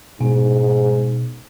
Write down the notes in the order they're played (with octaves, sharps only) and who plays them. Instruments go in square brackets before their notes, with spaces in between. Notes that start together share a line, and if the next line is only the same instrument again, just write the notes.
[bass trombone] G#2 [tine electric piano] B2